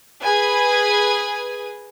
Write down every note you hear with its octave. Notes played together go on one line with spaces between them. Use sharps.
G#4 B4 G#5